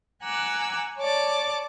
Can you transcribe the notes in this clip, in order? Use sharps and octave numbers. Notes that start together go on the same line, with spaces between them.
F#5 G#5 A#5 D6 E6 F#6
C#5 D5 A5 D6